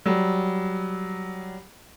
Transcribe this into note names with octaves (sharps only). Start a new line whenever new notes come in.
F#3 G3